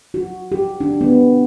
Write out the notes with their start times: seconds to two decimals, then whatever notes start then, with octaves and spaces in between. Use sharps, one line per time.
0.14 F#4
0.52 G4
0.80 D4
1.01 B3